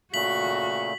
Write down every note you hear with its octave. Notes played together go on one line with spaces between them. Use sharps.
A#2 C#3 A3 F#4 B6 F#7